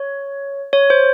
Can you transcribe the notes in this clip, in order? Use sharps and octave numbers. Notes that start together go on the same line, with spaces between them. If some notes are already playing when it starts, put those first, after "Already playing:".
Already playing: C#5
C#5
C5